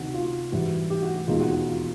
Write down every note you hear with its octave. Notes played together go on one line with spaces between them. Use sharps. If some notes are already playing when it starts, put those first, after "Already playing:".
Already playing: D2 C3 D#3 F#4
F4
G#2 E3 G3 F#4
G4
F#4
F#4
E1 D#2 D#3 G#3 F4
F#4
F#4
F4